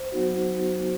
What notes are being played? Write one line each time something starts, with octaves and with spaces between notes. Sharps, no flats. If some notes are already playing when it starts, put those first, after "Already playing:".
Already playing: C5
F#3 B3 D#4 F#4